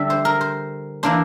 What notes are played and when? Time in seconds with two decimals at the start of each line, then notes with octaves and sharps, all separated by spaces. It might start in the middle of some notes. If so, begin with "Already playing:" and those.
Already playing: D3 G3 D4 D5 E5
0.10 C5
0.25 A#4
0.41 C5
1.03 E3 A#3 D4 C5